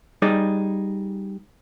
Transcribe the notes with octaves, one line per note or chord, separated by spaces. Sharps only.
G3 D#4 G#4 D5